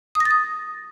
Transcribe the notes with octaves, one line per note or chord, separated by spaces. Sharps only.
D#6
A#6
A6
D#6